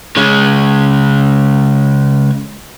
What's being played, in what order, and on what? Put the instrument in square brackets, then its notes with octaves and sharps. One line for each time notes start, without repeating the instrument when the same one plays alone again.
[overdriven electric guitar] C#3 G#3